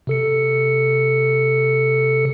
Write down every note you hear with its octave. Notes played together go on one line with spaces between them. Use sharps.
C3 A4 C#7